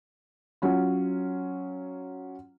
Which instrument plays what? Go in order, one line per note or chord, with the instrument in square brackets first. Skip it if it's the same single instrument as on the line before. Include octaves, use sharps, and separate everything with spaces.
[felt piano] F#3 C#4 F4